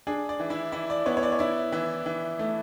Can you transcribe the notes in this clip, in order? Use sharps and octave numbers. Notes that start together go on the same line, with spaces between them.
D4 G#4 G#5
D5
E3
E4 E5
E3 E4 E5
D5
B3 C#5
C#5
D5
C#5
E4 D5
E3 E4 E5
E3
A3